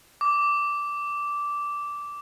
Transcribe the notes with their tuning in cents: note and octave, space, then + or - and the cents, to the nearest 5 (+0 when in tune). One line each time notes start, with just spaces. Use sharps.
D6 -10